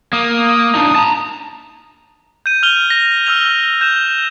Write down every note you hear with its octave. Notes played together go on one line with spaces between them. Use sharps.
A#3 D#6
D4 D#4
A5 A#5
G6 D#7
F6 F7 G7
A#6
E6 F6 G6 F7
G6 E7